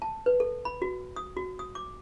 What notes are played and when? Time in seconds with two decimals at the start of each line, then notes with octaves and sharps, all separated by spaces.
0.02 A5
0.26 B4
0.40 A4
0.65 B5
0.82 F#4
1.16 D#6
1.37 F#4
1.59 D#6
1.75 D6